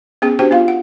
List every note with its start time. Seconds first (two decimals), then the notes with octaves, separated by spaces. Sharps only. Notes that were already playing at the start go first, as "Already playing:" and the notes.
0.22 B3 C#4 G#4 G5
0.39 D4 F#4 G4 C5 G5
0.51 B3 F4 F5
0.68 F#5